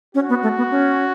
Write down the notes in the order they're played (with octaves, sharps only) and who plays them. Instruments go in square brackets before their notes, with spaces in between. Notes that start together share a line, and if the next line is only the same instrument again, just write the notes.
[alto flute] C#4 [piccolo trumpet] F#4
[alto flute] B3
A3
B3
C#4